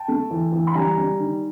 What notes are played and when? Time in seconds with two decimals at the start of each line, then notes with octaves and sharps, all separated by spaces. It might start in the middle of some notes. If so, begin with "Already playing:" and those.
Already playing: G5 A5
0.08 A3
0.31 E3
0.52 E3
0.67 B5
0.75 G3 G#5 A#5
0.98 G3
1.20 D#3